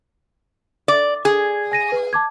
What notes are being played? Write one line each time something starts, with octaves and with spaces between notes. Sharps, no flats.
D5
G#4 G#6
G#5 A#6 D#7
B4
A5 D6 G#6